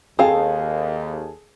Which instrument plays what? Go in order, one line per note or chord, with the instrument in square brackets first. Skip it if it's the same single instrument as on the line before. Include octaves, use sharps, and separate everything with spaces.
[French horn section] D#2 [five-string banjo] C4 F5 [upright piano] G#4 A4 A5